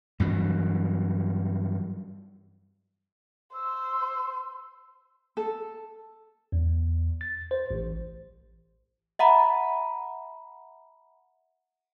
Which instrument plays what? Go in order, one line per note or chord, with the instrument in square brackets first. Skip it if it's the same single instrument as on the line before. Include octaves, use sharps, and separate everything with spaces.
[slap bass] G2 E3 F#3
[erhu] C5 [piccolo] E6
[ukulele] A4
[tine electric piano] E2
A6
C5
A1
[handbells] E5 F#5 A#5 B5